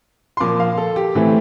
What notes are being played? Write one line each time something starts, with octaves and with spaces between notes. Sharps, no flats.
C6
A#2 F3 A#3 D6
F5
A4
G4
A2 E3 A3 C4